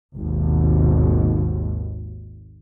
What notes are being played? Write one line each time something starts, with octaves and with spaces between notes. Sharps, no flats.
G#1 D#2 B2